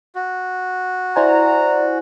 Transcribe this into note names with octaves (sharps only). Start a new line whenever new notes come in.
F#4
E4 C5 D5 F#5 G#5 A#5